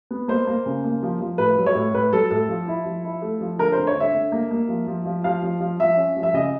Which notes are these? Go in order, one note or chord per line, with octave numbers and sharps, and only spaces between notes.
B3
A#3 C5
A#3
C#3
A#3
F3
F3
A2 B4
F#3
C#5
A2
A2 B4
F#3 A4
A2 A4
F3
E4
F3
E4
A3
F3
D3 A#4
C5
D3
C#5
D3
E5
D3
A#3
A#3
F3
F3
F3
F3 F5
F3
F3
F3 E5
C#4
F3
E5
C#3 D#5